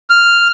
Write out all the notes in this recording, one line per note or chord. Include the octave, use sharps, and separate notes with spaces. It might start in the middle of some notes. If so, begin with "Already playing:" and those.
F6